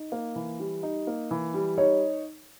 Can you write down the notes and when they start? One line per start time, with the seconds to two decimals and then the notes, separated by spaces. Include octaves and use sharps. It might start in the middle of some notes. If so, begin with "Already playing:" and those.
Already playing: D#4
0.12 A#3
0.36 E3
0.60 G3
0.83 D#4
1.07 A#3
1.31 E3
1.54 G3
1.78 D#4 C#5